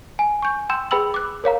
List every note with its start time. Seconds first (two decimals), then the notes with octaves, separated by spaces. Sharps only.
0.19 G#5
0.42 C#6 G6
0.69 G5 C6 E6 G6 E7
0.91 G#4 B4 G5 B5 E6 F#7
1.14 D6 F#6
1.44 A#4 C#5 F5 A#5